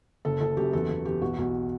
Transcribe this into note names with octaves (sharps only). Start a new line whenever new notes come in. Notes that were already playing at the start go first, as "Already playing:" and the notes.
F#1 A4
F#1 A4
F#2 G4
E2 A4
E2 A4
E2 G4
B1 F#4
B1